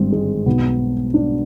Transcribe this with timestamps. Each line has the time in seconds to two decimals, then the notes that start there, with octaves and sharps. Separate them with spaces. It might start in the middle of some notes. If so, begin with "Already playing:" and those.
Already playing: G#1 G2 D3 G3 C4
0.12 G#3
0.46 B1 B2 B3
1.14 D4